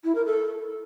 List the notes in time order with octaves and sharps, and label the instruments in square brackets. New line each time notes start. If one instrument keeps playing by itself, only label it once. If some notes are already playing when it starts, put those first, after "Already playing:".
[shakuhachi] E4
A#4
A4